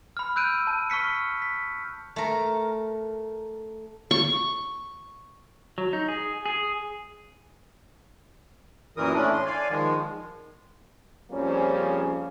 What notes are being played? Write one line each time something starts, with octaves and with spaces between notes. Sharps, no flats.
B5 F6
E6 F#6 G6 D7 D#7
A5
C#6 F6 B6 C#7
B6
A3 A#4
C#6
F#3
D#4
G#4
G#4
F#2 A#2 E3 A#4 D#6
A2 A3 C#4 D4
C6
D5 F5 G#5
D#3 F3 G#3
F2 C#3 F3 G3 A#3 C#4